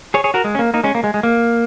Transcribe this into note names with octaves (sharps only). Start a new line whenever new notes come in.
G#4 C#5
G#4 C#5
F#4 A#4
G#3
C#4
A#3
A#3 D#4
G#3 C#4
A#3
G#3
G#3
A#3